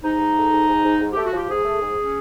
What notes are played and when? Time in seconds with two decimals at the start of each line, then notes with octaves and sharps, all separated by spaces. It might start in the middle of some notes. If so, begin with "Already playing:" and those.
0.03 G#2 D#4
0.20 G#2
0.37 A3
0.53 G#2
0.69 G#2
0.84 G#2
1.01 G#2
1.13 A3 G4
1.25 F#4
1.33 F3 G4
1.49 G#2 G#4
1.65 A3
1.82 G#2
1.98 C#4